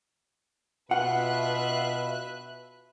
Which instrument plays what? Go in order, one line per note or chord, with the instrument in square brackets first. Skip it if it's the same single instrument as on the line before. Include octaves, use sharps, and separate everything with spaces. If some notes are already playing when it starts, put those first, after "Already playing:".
[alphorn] B2 [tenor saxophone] F4 [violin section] B4 E5 F#6 [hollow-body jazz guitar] F#5